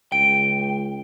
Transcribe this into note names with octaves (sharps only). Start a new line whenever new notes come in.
C#2 G5 D7